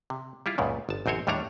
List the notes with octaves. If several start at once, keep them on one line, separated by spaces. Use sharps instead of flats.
C3
G3 E4 F4
C#2 F#2 A#2 C#3
G1 A5
A1 F#2 C4 C5 C#5
D#2 A2 G3 D4 C#5 A#5